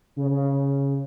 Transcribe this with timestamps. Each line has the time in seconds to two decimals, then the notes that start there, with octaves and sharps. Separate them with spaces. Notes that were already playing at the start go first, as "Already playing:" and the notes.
0.16 C#3
0.31 C#3